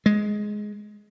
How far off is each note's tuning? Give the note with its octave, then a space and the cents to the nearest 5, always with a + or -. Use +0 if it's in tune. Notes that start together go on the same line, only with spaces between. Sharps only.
G#3 +10